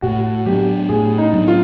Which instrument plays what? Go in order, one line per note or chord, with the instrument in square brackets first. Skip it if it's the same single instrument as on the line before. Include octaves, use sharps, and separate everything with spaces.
[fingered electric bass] A2 [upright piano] F#4
[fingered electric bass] F#3 B3 D4 [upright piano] G4
[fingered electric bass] A2 [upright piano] G#4
[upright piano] D#4
[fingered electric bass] F#3 B3 D4
[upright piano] F4